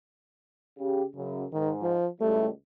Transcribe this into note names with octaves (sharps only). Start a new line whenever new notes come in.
C#3 G4
F#2 C#3
G#2 D#3
F3
C#2 A2 G3 A3